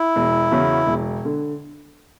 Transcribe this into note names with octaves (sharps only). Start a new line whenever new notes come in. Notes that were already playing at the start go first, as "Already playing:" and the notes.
Already playing: E4
E1
E2 C#3 F#3 C#4
E1
D3